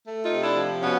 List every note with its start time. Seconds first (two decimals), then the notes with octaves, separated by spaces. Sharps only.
0.05 A3
0.24 D#4 F4
0.31 C3
0.43 D4 E4
0.56 F3
0.81 B2 B3 C#4